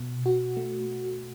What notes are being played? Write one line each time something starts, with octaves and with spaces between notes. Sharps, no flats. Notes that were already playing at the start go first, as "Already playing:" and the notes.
Already playing: B2
F#4
A3